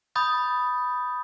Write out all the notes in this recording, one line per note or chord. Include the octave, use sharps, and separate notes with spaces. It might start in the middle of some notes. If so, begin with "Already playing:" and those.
B5 D#6 G6 A6